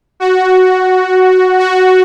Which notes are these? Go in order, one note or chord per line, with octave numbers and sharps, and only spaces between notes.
F#4
F#4